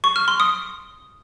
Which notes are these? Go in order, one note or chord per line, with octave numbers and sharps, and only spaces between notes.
C#6
F6
C6
D#6